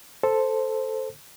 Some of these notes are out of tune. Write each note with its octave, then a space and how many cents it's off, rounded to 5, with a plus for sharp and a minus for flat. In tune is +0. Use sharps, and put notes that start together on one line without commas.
A4 +0 C5 +0